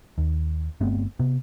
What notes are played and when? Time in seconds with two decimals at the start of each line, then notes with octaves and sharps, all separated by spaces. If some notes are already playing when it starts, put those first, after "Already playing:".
0.18 D#2
0.80 G1 A3 B3 C4
1.19 C3 B3